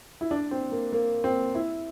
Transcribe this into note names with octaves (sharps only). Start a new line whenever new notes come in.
E4
D4
C4
A#3
A#3
C4
E4